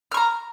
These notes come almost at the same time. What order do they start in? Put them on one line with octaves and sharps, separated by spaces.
F6 C#6 A#5